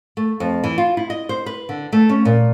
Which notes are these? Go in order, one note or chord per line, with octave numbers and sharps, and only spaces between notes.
A3
F2
E3
F4
E4
D#5
C5
B4
D3
A3
C#4
A#2